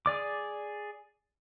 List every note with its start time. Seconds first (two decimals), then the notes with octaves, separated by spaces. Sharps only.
0.06 G#4 D5 D6